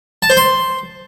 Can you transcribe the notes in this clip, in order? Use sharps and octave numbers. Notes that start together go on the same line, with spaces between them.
A5
C5
C6